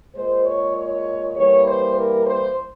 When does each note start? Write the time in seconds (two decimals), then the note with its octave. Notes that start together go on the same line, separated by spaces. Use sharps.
0.15 A#2 G#3 C5
0.45 C#5
0.76 C#5
1.35 E3 G3 A#3 C#5
1.66 C5
1.96 A#4
2.26 C5